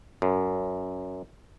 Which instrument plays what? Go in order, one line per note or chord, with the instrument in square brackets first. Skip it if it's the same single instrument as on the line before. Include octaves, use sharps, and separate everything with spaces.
[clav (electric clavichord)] F#2